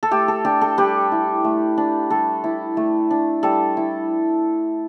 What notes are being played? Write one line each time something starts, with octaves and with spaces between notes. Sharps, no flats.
A4
A3 G4
A4
D4 G4
A4
G3 G4 B4
E4
A3
D4
G3 A4
E4
A3
D4
G3 A4
E4